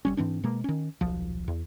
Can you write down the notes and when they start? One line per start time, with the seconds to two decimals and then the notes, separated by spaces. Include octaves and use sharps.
0.05 F#1 G3 C#4
0.17 G#2 E3 C4 D4
0.43 B2 G#3 A#3
0.64 D#3 C#4
1.01 D#1 B1 F3
1.48 E2